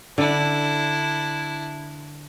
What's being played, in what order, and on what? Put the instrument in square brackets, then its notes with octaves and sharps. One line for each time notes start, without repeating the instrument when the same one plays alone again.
[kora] D3 [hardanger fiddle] D4 E4